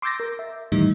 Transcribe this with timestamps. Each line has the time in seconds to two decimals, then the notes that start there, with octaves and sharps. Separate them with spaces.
0.02 C6 D6 E6 G6 A6 A#6
0.20 A#4
0.39 E5
0.72 A2 D#3 E3 G3 D#4